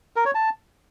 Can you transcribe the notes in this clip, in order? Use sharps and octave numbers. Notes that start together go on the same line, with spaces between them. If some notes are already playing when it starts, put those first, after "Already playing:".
A#4
C#5
A5